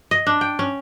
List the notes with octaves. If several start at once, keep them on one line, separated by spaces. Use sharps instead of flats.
D#5
D4
G5
C#4